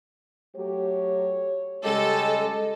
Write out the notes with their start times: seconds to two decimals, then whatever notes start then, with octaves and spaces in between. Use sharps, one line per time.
0.56 F#3 A3 G4 C#5
1.84 C#3 G3 G#3 G4 A4 D#5